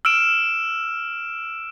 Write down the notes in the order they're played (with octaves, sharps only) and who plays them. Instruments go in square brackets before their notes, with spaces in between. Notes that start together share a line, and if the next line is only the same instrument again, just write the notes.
[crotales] E6 F6 D7 E7